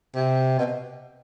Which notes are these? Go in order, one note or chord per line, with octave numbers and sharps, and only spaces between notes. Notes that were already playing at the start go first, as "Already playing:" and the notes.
C3
B2